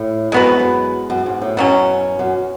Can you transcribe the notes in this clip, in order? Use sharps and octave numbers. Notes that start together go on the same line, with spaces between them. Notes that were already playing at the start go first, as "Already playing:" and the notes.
Already playing: A2
F#2 G#3 B3 F#4 B4
F2
F#2
F#2
G#2
A2
F#2 B2 F#3 C#4
F#2